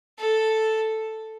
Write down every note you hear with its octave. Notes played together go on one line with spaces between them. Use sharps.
A4